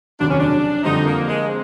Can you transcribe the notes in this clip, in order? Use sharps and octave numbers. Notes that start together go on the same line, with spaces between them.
F1 D#2 C#3 F#3 D4
C#4
D4
F2 D3 G3 C4 D#4
A#3
G#3
C4